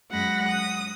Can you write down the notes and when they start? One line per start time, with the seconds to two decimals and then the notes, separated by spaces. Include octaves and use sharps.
0.10 F#2 G#3 F#5 B5 A#6
0.48 D#6